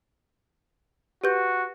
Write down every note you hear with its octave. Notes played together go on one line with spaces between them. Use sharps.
F#4 G4 B4 G6